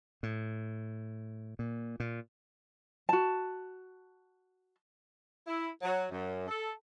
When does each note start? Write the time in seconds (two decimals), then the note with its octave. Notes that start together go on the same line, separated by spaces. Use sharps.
0.23 A2
1.59 A#2
2.00 A#2
3.09 F#4 A5
5.47 E4
5.82 F#3
6.11 F#2
6.47 A4